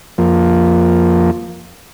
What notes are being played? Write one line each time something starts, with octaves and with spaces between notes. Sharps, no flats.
F2 F3 A#3